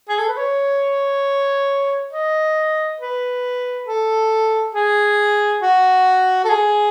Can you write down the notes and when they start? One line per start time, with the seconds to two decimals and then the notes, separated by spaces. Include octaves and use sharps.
0.09 G#4
0.19 A4
0.28 B4
0.37 C#5
2.12 D#5
3.00 B4
3.87 A4
4.75 G#4
5.62 F#4
6.44 A4
6.50 G#4